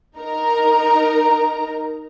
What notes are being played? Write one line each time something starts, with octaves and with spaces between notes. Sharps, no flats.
D#4 A#4 A#5